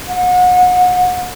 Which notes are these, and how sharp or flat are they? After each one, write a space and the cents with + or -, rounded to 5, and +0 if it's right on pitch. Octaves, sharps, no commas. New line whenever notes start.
F#5 -35